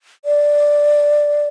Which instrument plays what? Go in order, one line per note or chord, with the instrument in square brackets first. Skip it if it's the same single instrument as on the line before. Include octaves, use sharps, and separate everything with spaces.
[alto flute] D5